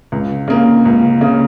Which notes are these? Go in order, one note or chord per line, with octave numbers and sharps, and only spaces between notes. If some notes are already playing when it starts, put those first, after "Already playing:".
C#2
C#3 A#3
C#2
C#3 A#3